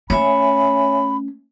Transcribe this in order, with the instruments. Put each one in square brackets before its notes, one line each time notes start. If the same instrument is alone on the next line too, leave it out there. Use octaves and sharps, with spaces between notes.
[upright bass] A3 C#4 [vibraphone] C#5 E5 G#5 [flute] B5